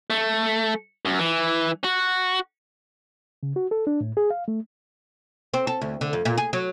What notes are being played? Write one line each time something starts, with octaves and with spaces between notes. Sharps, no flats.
A3
F#2
E3
F#4
C#3
F#4
A4
D4
A2
G#4
F5
A3
C4
A4
D2
D3
F2
A#2
G#4
F#3